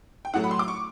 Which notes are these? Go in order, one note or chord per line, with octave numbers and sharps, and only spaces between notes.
G5
A2 F#3 A3 F#5
B5
C6
D6
C#6